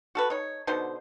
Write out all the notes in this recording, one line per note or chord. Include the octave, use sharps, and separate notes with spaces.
F#4 A4 B4
D#4 C#5
B2 D3 D#4 C5